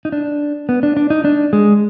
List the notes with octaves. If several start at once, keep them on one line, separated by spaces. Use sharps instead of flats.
D#4
D4
B3
D4
D4
D#4
D4
G#3